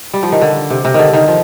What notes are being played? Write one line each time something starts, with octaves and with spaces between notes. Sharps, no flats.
G3
F3
D#3
D3
C3
C3
D3 D#3
D#3
F3